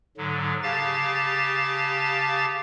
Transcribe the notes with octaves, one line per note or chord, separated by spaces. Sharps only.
G#2 D3 F#3
C#3 G4 F5 A5 A6